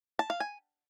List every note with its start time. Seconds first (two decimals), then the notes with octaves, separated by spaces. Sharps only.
0.19 A5
0.30 F5
0.40 G#5